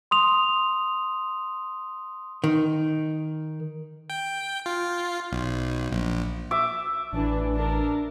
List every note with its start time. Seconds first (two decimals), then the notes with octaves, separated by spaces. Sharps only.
0.11 C6 D#6 F7
2.44 D#3
4.10 G5
4.66 F4
5.32 B1
5.92 A#1
6.51 E5 D6
7.13 A1 E3 D4
7.53 D4 A#4